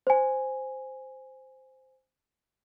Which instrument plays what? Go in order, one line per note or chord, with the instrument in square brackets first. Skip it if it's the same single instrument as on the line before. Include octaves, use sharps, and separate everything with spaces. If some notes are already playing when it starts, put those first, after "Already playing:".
[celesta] C5 G#5